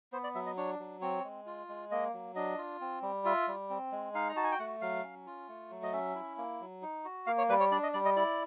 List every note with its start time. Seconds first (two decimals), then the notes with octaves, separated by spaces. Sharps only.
0.12 B3 C5
0.24 D5
0.35 F#3 E5
0.46 D#5
0.57 D4 C#5
0.80 F#3
1.01 C4 C#5
1.24 G#3
1.46 F4
1.69 G#3
1.91 A#3 D#5
2.14 F#3
2.35 D4 D#5
2.58 F4
2.81 C4
3.02 G3
3.25 F4 E5
3.48 G3
3.70 C4
3.92 G#3
4.15 D#4 F5
4.29 A#5
4.36 F#4 A5
4.44 G#5
4.51 G5
4.59 A3 F#5
4.81 F#3 F5
5.03 C#4
5.26 F4
5.48 A3
5.71 F#3
5.83 D#5
5.93 C#4 E5
6.15 E4
6.38 A#3
6.60 F#3
6.82 D#4
7.05 F#4
7.27 A#3 F5
7.38 C#5
7.49 G3 B4
7.60 C#5
7.71 D4 D5
7.83 D#5
7.93 G3 D5
8.05 D#5
8.16 E4 D5